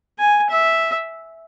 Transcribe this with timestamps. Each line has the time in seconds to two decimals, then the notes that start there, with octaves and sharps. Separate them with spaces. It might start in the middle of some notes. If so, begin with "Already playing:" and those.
0.19 G#5
0.50 E5